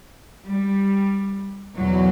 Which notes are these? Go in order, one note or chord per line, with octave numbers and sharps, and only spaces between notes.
G3
E2 B2 F#3